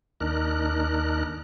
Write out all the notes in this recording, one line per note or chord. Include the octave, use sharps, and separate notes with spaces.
D#2 D4 D#4 A#4 F#6